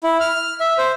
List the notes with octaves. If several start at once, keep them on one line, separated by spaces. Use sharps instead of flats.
E4
F6
E5
C5